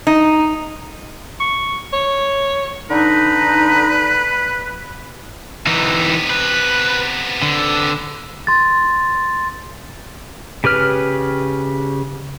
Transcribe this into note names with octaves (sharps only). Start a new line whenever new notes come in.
D#4
C#6
C#5
D3 D#4 B4
C3 E3 B3 D#4
B4
D3
C6 A6
C#3 G4 B4 F6